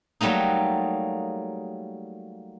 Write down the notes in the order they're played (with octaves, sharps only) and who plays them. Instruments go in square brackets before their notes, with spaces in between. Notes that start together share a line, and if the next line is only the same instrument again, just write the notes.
[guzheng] F#3 G3 A3 A#3 D#4